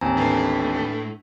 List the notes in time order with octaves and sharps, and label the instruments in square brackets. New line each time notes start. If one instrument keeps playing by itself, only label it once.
[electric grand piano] A1 D#2 C4 [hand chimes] G#5 A#5
[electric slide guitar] A2 A3 [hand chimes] D4 B4 C7